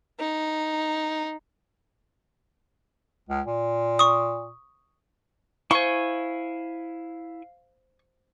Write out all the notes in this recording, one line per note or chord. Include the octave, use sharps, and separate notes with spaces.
D#4
C#2
A#2
C#6 D#6
E4 C5 F5 G#5 C#6 G7